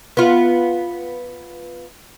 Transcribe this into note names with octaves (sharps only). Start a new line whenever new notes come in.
B3 F4